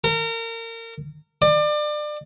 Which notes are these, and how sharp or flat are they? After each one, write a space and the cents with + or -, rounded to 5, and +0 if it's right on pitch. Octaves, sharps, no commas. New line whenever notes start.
A#4 -30
D5 +30